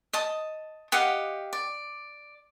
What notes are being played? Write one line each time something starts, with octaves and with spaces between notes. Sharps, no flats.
D#5 A5 D#6
G4 D#5 F5 F#5
D5